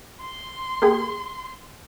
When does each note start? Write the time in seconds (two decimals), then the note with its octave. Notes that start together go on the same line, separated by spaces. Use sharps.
0.21 C6
0.82 A#3 G4 G#4